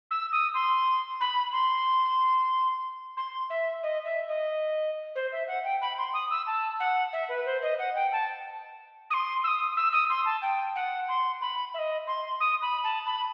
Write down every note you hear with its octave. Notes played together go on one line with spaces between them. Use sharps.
E6
D#6
C6
B5
C6
C6
E5
D#5
E5
D#5
C5
E5
F#5
G5
B5
C6
D#6
E6
A5
F#5
E5
B4
C5
D#5
F#5
G5
A5
D#6
C6
E6
D#6
E6
D#6
C6
A5
G5
F#5
C6
B5
E5
D#5
C6
D#6
B5
A5
B5